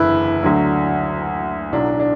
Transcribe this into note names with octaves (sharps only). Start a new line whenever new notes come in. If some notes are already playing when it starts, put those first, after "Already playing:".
Already playing: F#1 E2 D3 E4 B4
D2 D3 F#3
B1 A2 F#3 D4
D4